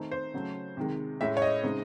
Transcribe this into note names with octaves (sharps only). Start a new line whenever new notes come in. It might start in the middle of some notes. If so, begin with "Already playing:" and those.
Already playing: D#3 A3 C4 D#4
C5
C#3 F#3 A3
C3 D#3 G#3
A2 G#3 C#4 E5
C#5
D#5
C#3 G#3 C4 D#4